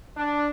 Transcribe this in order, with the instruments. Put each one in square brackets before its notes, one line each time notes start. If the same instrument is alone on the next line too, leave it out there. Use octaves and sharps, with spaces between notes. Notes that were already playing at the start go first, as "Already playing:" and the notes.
[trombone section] D4